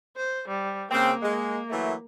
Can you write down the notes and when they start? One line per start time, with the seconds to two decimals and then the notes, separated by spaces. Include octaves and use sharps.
0.17 C5
0.48 G3
0.91 C#3 A#3 C4
1.22 G#3
1.69 E3 F#3 A3